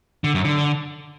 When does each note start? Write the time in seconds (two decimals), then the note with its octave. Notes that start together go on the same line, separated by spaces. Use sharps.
0.24 D3
0.34 F#2
0.45 D3